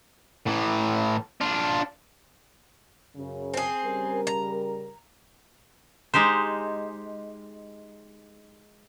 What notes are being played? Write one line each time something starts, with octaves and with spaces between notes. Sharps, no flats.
A2 E3
D4 F4
F#2 C#3
C4 G#4
C#3 G3 A#4
A#5
G#3 D#4 G4 C5